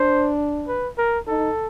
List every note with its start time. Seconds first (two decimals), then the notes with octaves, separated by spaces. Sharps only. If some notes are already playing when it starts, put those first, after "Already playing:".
Already playing: D4 C5
0.68 B4
0.98 A#4
1.28 D#4 A4